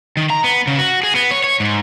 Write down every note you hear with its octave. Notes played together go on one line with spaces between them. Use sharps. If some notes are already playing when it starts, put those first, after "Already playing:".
D#3
A#5
B3
C#3
F#4
G#4
B3
C#5
C#5
G#2